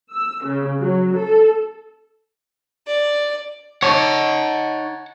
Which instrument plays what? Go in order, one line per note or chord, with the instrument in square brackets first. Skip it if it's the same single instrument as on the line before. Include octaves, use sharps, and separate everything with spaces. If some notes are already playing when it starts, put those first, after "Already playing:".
[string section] E6
C#3
F#3
A4
[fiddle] D5
[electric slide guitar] D#4 C#5 [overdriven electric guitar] F#5 A5